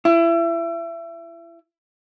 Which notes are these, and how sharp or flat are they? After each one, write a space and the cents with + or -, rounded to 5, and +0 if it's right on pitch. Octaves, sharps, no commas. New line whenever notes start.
E4 +30